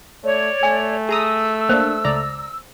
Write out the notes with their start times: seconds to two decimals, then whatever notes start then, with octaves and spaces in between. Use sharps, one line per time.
0.24 A3 C#5 D5
0.63 A3 G#5
1.09 G#4 A#5 D#6 E6
1.69 A#3 D4 C5
2.05 C#2 D5 A#5